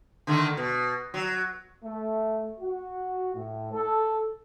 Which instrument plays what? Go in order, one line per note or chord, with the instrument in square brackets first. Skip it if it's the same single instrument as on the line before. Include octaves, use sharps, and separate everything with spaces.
[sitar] D3 D#3 A3
B2
F#3
[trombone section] A3
F#4
A2
A4